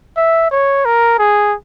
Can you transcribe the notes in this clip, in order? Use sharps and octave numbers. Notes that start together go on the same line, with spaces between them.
E5
C#5
A#4
G#4